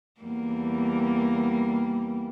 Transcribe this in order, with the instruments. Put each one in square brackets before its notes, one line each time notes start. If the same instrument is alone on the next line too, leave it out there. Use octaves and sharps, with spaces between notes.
[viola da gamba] E2 G3 A#3